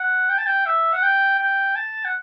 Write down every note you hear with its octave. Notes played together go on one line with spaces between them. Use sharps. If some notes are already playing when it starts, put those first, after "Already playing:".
Already playing: F#5
G5
A5
G5
E5
F#5
G5
G5
A5
F#5